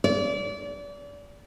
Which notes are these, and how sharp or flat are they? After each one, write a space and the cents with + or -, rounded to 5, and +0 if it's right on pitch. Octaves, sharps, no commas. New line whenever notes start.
D5 -30